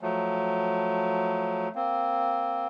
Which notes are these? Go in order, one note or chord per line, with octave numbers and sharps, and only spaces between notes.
F3 F#3 A3
A#3 C4